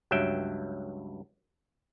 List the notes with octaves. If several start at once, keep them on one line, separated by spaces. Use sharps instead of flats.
C#2 G2 F#3 E5 G5